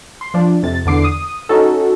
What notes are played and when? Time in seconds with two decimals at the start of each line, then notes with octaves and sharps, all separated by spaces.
0.21 C6
0.34 F3 D4
0.63 F2 C3 A6
0.86 E2 D3 D6 C7
1.04 D#6
1.49 C#4 D#4 F#4 A4